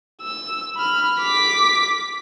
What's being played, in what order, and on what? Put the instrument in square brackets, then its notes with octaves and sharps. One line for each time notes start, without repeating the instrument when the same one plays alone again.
[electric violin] E6
B5 F6
D6 B6